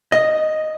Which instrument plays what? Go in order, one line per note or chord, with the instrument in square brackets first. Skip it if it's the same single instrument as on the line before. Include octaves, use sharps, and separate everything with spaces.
[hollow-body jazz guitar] D#5